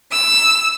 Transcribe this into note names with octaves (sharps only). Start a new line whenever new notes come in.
E6